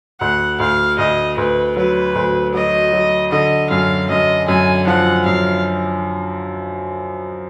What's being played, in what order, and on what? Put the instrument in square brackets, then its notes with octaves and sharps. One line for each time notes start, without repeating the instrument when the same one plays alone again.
[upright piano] D2 [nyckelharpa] F#5
[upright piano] D2 [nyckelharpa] F5
[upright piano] D2 [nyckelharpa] D#5
[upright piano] D2 [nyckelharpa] B4
[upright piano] F#3 [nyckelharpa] B4
[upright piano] D2
[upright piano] F#3 [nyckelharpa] D#5
[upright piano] F#3
[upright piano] D3 [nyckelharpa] D#5
[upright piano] F#2 [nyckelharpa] F5
[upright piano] F#2 [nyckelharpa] D#5
[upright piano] F#2 [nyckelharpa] G#5
[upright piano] F3 [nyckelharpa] F#5
[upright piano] F#2 [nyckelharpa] F5